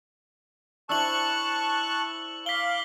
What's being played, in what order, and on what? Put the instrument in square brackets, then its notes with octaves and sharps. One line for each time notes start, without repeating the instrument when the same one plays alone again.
[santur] D4 E4 C5 [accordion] A5 C#6 F#6 [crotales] E6 F#7
[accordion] F5 D6 [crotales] B6 G7